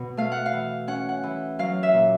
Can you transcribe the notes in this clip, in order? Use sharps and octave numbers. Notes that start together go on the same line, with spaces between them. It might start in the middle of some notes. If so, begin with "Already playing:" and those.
Already playing: B2
A3 F5
F#5
F5
E3
C#4 F#5
F#5
E3
F#3 F5
E5
A#2